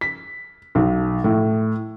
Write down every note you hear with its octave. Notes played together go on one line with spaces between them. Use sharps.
B6
B1
A2